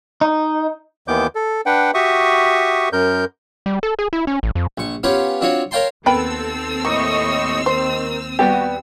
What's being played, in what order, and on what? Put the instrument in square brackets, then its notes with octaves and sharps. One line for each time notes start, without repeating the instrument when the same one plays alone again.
[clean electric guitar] D#4
[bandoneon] D#2 D#3 E3 B3 D6 G6
A4
D4 B4 F#5 G5
F#4 G4 E5 C#6 D#6
F#2 A#4 G6
[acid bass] G3
A4
G#4
E4
C#4
A1
F2
[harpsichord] A#1 C#6
B3 C#4 F4 G4 C#5
C4 D4 F4 F#4 C#5
A#4 C#5 F5 G5 A5 C6
[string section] D#2 C4 E6 [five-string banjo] B3 [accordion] A4 [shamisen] A#4 G5 B5
[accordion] A2 D#5 C#6 [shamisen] A#3
[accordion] D#3 [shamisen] C5
[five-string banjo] G3 B3 G4 [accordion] F#4